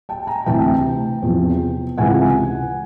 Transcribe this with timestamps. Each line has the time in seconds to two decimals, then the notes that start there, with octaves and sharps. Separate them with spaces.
0.09 G5 A5
0.27 G#5 A#5
0.46 D2 C3 E3 G5 A5
1.22 E2 C3 F3
1.98 C#2 C3 E3 F#5 G#5